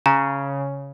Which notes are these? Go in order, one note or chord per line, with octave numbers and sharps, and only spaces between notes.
C#3 A#5